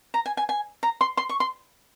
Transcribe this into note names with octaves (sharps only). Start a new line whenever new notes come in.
A#5
G#5
G#5
G#5
A#5
C6
C6
C#6
C6